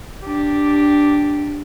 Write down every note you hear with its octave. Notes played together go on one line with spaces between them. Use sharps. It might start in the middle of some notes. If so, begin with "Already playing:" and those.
D4 G4